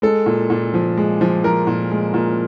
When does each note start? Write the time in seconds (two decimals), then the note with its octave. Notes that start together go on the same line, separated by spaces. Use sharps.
0.02 G#3 A4
0.26 A#2
0.50 A#2
0.74 F3
0.97 G#3
1.21 F3
1.44 F3 A#4
1.67 A#2
1.91 G#3
2.14 A#2